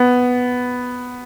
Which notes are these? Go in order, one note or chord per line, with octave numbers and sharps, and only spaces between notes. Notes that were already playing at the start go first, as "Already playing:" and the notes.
Already playing: B3